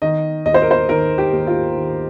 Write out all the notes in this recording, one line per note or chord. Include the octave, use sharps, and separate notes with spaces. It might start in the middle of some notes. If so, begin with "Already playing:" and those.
D#3 D#5
D#2 D#5
C5
A#4
C5
D#3 A#4
G4
D#2
F4
D#3